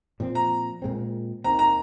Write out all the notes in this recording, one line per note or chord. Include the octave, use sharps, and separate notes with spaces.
A#2 F3 C4
A#5
A#2 G#3 C4
D#2 D#3 C4 A#5
A#5